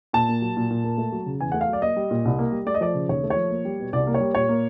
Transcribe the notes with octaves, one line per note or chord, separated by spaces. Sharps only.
A#2 A5
A#3
F#3
A#2
A#2
A#3
A3
F#3
C#3
E2 G#5
A3 F#5
F5
F#3 D5
A#3 D#5
G3
A#2
C2
A#3
G3
A3 D5
D#5
F3 D5
C#3
D#2 C#5
A3
C#5
F3
A#3
G3
B2
C2 D5
A#3
C#5
G3
A#2 C#5
A#3